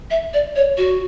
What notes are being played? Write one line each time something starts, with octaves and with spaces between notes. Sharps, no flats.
E5
D5
C#5
F#4